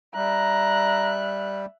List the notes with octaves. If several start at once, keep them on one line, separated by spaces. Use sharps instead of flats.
G3 E5 A#5 F#6